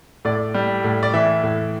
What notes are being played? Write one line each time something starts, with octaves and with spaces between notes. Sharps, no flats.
A2 D5
G3
A2
D5
E3 E5
A2